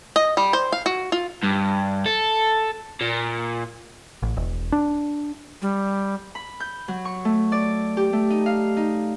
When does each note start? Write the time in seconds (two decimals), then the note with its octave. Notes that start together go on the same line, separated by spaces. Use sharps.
0.16 D#5
0.37 G3
0.53 C5
0.72 F5
0.86 F#4
1.12 F4
1.43 G2
2.06 A4
3.01 A#2
4.22 A1
4.37 E1
4.72 D4
5.62 G3
6.35 B5
6.60 G6
6.88 F#3
7.05 C#6
7.25 A3
7.52 D5
7.97 G4
8.13 A3
8.30 D#4
8.46 F5
8.76 D#4